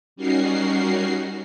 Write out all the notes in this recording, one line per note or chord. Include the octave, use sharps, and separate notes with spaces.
G3 C#4 D#4 F#4 A#4 C7